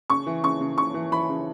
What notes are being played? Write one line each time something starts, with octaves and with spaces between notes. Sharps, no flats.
C#3 C#6
E3
C#3 C#6
C#3
C#3 C#6
E3
E3 B5
C#3